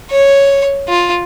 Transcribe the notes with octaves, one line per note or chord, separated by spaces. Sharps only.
C#5
F4